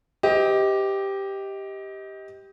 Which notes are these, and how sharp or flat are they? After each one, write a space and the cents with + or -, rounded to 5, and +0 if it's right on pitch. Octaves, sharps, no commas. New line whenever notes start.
G4 +0 C5 -45 D#5 +25